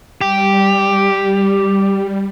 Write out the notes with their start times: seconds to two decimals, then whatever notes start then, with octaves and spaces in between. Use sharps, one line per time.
0.21 G3 G4